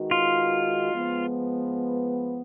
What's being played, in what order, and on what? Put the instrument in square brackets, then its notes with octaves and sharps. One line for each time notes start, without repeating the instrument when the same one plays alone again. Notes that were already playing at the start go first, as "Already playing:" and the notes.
Already playing: [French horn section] D#3 G#3 D#4 F#4 B4
[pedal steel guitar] F4
[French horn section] F3 G#3 B3